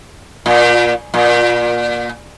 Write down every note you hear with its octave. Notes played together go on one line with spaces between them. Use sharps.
A#2
A#2